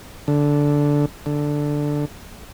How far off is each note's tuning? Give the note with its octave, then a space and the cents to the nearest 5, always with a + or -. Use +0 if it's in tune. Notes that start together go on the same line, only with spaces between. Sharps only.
D3 -10
D3 +0